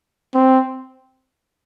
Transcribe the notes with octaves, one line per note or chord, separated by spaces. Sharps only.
C4